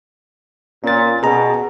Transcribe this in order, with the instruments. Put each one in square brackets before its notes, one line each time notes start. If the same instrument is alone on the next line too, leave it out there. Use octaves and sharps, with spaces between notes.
[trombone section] A#2 [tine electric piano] C#4 A6
[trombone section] B2 [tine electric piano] G#4 A#5